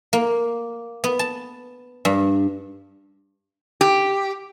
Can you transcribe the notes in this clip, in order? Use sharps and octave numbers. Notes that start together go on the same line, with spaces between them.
A#3
B3
A5
G2
G4